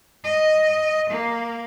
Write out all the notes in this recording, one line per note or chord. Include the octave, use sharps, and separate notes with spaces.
D#5
A#3